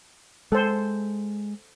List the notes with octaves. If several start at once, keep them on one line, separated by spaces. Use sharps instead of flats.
G#3 A4 C5